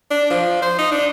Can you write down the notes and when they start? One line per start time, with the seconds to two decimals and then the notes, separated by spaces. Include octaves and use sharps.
0.11 D4
0.30 F3
0.62 C5
0.78 D#4
0.92 D4